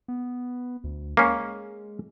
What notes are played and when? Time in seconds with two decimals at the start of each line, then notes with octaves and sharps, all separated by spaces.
0.08 B3
0.84 D2
1.17 G#3 A#3 C#4